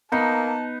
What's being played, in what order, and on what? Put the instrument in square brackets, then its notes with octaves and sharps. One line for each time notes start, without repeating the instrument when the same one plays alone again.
[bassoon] A#3 [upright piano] B3 [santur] D#4 [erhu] A5